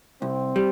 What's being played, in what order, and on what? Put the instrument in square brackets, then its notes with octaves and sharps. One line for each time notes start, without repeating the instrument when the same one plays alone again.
[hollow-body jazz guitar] C2 [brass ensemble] C4
[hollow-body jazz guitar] G3